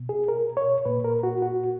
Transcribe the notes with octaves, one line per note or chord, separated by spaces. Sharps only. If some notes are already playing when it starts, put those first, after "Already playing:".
Already playing: B2
G#4
A#4
C#5
A#2 B4
A#4
F#4
F#4